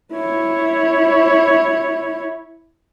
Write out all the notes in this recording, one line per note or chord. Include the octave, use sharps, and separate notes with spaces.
E4 C#5